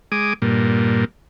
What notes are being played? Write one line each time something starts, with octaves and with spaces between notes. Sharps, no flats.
G#3 D6 D#6
G2 A#2